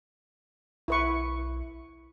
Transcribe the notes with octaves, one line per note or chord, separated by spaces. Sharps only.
B1 E4 B4 C#6